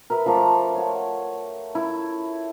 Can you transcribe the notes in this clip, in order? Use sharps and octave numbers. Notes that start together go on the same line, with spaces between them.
A#4 B4 E5
F3 A3 A#5 D6
C#5 F#5
E4